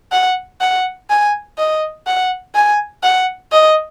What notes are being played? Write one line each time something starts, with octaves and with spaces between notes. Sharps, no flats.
F#5
F#5
G#5
D#5
F#5
G#5
F#5
D#5